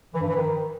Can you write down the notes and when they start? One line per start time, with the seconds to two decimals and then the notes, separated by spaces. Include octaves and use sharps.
0.14 E3
0.21 G2
0.28 E3
0.35 D#3